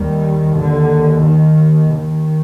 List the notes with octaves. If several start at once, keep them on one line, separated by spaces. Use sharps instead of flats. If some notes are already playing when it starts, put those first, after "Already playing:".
Already playing: D#2 D#3 G3
D3
D#3
D#3